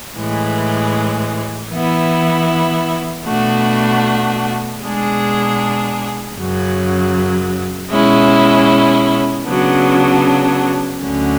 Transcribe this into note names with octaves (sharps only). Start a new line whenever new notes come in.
A2 E3 G#3
E3 B3 E4
B2 A3 D4 F#4
B2 G#3 D4 G#4
F#2 C#3 F#3
B2 G#3 C#4 E4
C#3 F#3 B3 D4
D2 D3 F#3 C#4